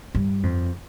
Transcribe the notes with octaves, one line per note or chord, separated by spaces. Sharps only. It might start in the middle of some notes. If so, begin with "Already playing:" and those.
G2
F2